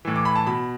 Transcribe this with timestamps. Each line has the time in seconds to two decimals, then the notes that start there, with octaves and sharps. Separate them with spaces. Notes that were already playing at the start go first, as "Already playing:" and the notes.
0.05 A2 E3
0.16 D6
0.25 B5
0.35 A5
0.47 B2 B5